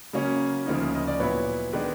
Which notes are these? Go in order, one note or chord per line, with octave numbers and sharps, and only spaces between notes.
C#3 F#3 A#3 C#4
D2 C#3 F3 A#3 D#4
D#5
D5
A#2 F#3 B3 E4 B4 C#5
D#3 G#3 B3 D4 B4